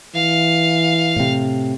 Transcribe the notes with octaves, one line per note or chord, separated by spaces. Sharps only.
E3 F5
A2 C3